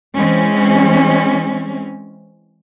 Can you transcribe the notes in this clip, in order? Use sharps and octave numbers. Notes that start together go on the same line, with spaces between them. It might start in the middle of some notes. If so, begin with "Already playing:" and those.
E3 G#3 C4 C#4